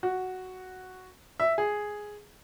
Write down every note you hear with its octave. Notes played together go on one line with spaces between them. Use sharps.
F#4
E5
G#4